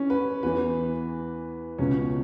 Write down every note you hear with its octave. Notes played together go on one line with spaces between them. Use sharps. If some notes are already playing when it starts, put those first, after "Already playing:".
Already playing: E3 C#4
B4
E2 E3 B4
C#2 B2 C#4